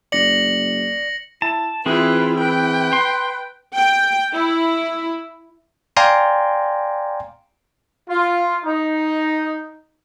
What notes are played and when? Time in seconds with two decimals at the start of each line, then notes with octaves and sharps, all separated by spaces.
0.12 F#1 D5 A#6 C#7 F#7
1.42 E4 A5
1.86 E3 C4 E4 F4 G#4 B4
2.40 B4 G5
2.93 C6
3.76 G5
4.33 E4
5.97 D5 F5 G5 G#5 A#5 C6
8.10 F4
8.65 D#4